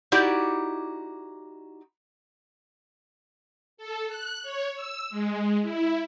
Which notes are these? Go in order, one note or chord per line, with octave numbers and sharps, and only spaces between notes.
D#4 E4 F#4 G4 D5
A4
F#6
C#5
E6
G#3
E4